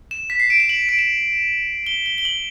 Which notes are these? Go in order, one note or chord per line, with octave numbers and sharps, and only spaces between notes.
E7
B6
C7
D7
E7
F#7
D7
E7
G7
G7
G7
F#7